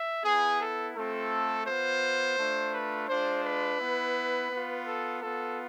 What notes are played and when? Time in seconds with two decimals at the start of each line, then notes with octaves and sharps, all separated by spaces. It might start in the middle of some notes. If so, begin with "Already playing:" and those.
Already playing: E5
0.24 B3 E4 G#4
0.59 A4
0.95 A3 C4 F4 A4
1.66 B3 F4 C5
2.38 A3 D4 F4
2.73 B4
3.08 G#3 D4 F4 C5
3.44 B4
3.79 B3 E4
4.50 B3 F4
4.87 A4
5.21 B3 F4 A4